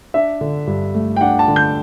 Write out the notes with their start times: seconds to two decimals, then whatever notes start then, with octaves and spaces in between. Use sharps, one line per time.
0.14 D4 E5
0.41 D3
0.67 G2
0.94 A3
1.16 G5
1.21 D4 F#5
1.39 A5
1.48 D3
1.56 G6